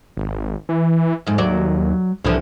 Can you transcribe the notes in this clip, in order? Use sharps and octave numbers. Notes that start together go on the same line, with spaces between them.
G#1
E3
F2 G#2
D#2 F#3 D5
C2 D3 E3 F3